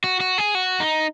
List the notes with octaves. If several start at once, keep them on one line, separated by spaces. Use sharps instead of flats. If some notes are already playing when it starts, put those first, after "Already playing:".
F#4
F#4
G#4
F#4
D#4